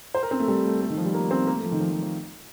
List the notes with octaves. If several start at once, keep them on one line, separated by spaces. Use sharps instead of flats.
C5
A#4
C4
A3
G3
A3
A3
D#3
F3
G3
A#3
C4
A#3
A3
F3
D#3
F3
F3
F3